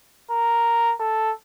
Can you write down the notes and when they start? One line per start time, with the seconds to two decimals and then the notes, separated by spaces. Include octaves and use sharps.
0.31 A#4
1.00 A4